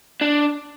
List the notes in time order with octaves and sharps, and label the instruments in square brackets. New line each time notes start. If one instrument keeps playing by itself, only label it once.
[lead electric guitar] D4